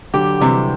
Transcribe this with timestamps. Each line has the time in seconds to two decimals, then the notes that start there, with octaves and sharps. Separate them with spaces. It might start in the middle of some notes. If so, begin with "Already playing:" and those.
0.13 D3 F#3 G4
0.41 C3 E3 G3